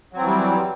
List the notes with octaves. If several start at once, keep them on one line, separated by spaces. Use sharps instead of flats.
E3 F#3 G3 C4